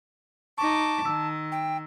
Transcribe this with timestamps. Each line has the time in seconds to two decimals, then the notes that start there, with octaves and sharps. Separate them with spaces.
0.58 D#4 A5 C#6 D6
1.05 D#3 E6
1.52 G5